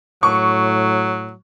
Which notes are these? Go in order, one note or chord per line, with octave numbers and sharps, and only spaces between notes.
A2 F#3 C#6